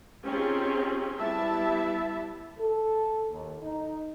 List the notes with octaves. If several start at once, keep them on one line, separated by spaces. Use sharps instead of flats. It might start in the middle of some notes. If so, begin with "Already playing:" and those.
C4 C#4 D#4 F4 G4 G#4
G3 B3 E4 E5 A5
A4
D#2
D#4